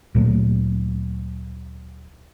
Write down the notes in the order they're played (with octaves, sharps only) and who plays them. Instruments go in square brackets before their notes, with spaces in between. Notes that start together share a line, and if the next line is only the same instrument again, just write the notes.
[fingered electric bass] D2 A#2 F#3 A3